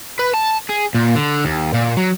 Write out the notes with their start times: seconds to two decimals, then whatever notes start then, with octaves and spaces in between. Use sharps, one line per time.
0.19 B4
0.34 A5
0.69 G#4
0.94 A#2
1.15 D3
1.45 D#2
1.74 A#2
1.97 F#3